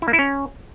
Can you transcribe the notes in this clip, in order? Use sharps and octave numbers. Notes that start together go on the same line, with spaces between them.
E4
A#3
E4
C#4